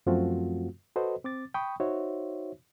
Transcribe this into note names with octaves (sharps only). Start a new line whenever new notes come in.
F#2 F3 A3 C4 F4 F#4
F#4 A4 B4 C5 D#5
C4 D6 A6
G5 B5 C#6 D#6
D#4 F#4 C5 C#5 E5